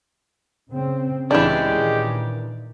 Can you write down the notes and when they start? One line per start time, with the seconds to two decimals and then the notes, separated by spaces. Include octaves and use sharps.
0.71 C#3 C4
1.31 C#2 A2 C#3 E3 G#3 D4 G4
1.72 A#2 D#3